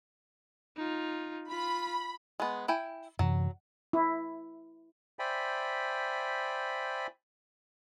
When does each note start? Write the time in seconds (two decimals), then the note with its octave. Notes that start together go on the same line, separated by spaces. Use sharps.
0.77 D#4 F4
1.50 F4 B5
2.40 G#3 B3
2.68 E4 G5 G#5
3.19 F#2 C3 E3 F#3
3.93 E4
5.19 C5 D5 E5 G5 G#5 B5